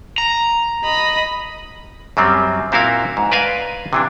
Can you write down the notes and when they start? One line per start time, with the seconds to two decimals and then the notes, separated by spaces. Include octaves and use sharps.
0.18 A#5
0.84 D#5 B5
2.17 F#2 F#3 G3 C4
2.72 A#2 C4 E4 F#4 A#4 F5
3.17 G#2
3.32 B4 D5 D#5 F5 G#5
3.93 C3 E3 D4